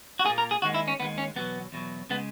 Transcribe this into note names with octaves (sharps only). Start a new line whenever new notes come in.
F#4
A#2 A#3 G#4
A#4
G#4
D#2 D#3 G#3 F#4
E4
C#4
D#2 D#3 G#3 B3
C#4
E2 B2 F#3 B3
E2 B2 F#3
C#3 G#3 B3